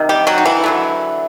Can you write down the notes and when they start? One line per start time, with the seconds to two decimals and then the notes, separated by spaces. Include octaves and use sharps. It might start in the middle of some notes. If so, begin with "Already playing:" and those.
Already playing: C3 D#3
0.09 G3 G4
0.27 F#3 F#4
0.38 D#4
0.45 E3 E4
0.64 D3 F#3 A3